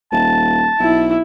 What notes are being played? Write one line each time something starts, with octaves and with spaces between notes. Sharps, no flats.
D#1 A5
B1 E4